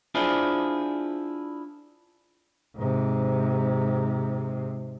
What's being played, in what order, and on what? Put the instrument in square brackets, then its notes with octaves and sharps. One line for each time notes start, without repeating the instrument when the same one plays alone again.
[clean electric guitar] D4 E4 F4 G#4 C5 D5
[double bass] G#2 C3